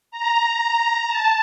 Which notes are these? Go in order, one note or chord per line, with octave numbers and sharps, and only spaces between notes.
A#5
A5